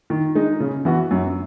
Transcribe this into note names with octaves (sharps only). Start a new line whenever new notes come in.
D#3
G#3 D#4
C#3
E3 B3 F#4
F#2